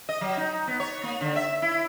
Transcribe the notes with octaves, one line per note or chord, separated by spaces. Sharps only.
D#5
F#3
D#4
B3
C#5
A#3
D3
E5
E4